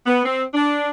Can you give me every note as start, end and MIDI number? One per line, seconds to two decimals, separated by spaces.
0.06 0.21 59
0.25 0.43 60
0.54 0.91 62